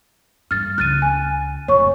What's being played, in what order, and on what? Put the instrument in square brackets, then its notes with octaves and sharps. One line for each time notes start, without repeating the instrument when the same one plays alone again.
[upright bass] G2 [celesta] F6 A6
[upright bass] C#2 [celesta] F#6 A6 D#7
[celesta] G#5
[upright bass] F1 B1 [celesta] C#5 C#6